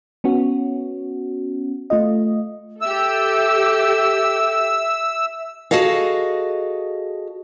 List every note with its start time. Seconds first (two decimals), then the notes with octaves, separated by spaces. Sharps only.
0.24 B3 C#4 F#4
1.90 A3 F4 D#5
2.81 G4 A4 E5 E6
5.71 F#4 G#4 A4 D#5 F5